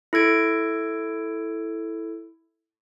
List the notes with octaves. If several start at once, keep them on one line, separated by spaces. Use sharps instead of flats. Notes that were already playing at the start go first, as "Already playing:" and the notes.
E4 A4 G#6 D7